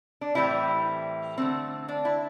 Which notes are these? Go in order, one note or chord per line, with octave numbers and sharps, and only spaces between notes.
D4
A2 E3 G3 C4 E4
D3 A3 C4
D4
E4